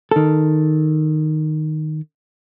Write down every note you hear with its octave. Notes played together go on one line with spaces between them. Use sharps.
D#3 A4